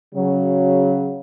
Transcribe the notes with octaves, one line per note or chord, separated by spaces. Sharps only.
C#3 F#3